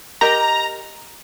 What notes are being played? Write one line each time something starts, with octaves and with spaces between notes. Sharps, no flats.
G4 A#4 D#5 A#5